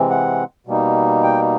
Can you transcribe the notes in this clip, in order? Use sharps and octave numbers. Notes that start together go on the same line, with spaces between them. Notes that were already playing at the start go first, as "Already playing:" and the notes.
Already playing: C3 E3 G#3 C4
F#5
B2 G3 A#3 D#4
G5